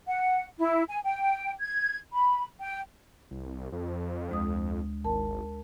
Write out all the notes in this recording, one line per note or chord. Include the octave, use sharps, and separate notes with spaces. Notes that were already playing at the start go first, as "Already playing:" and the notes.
F#5
E4
G#5
G5
G#6
B5
G5
C2
F2
D2 G#3 D#6
G#1 A#4 A5